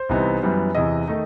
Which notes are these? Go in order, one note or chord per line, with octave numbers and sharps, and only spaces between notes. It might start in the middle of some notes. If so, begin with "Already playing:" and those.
Already playing: C5
C2 C3 E3 B3 D#4
F#2 E3 G3 B3
E2 C3 E3 D#5
D#3 A3 D#4